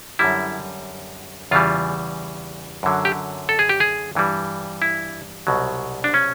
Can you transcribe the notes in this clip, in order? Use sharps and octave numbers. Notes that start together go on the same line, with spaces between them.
F#2 D3 G3 E4
E2 C#3 E3 G3 F4
F#2 D3 F#3
G4
A4
G#4
G4
G#4
G2 E3 G3
E4
C2 B2 F#3
D4
C#4